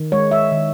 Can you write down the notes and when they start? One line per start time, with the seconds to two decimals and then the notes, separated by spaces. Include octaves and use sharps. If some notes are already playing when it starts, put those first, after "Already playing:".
Already playing: D#3
0.12 G#3 C#5
0.31 E5
0.52 D#3